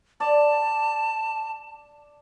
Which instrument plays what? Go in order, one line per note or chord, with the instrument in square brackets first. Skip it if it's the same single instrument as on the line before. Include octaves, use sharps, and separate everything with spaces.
[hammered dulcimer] D5 [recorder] A5